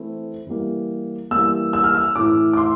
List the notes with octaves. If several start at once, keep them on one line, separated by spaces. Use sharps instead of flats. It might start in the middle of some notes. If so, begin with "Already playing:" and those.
Already playing: E3 A3 C4 E4
E3 G3 A#3
E3 G3 A#3 E6
E6
F6
E6
A2 E3 A3 E4 D6
D6
C6